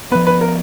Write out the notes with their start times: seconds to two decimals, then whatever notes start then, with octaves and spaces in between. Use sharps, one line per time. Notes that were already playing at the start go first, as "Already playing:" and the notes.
0.11 F3 B3 B4
0.27 B4
0.41 A#4